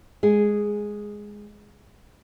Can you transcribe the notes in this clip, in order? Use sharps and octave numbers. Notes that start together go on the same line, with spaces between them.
G#3 G#4